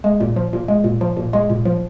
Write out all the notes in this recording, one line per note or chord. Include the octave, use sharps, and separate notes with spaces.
G#3
A#2
F3
A#2
G#3
A#2
F3
A#2
G#3
A#2
F3